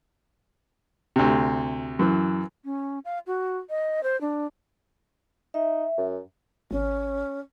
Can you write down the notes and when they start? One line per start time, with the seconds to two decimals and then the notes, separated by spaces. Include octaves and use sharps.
1.16 D2 C3
1.99 F#2 E3
2.65 C#4
3.05 F5
3.27 F#4
3.70 D#5
4.03 C5
4.21 D4
5.54 D#4 E5
5.98 F#2
6.71 G#1 C#4